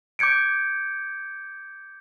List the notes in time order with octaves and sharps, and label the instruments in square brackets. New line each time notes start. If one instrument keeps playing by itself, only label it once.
[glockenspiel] D6 G6 G#6 C#7 D7